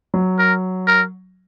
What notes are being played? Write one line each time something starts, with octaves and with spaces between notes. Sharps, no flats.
F#3
A#4
A#4